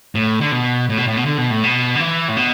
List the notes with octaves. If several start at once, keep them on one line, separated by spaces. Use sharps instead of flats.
A2
D3
B2
A2
B2
A2
B2
D3
B2
A2
B2
D3
E3
A2
B2